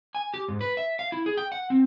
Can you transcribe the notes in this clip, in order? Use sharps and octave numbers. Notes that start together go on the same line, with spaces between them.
G#5
G4
G#2
B4
E5
F5
E4
G#4
G5
F#5
C4